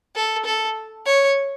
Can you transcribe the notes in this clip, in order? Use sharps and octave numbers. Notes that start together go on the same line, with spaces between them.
A4
A4
C#5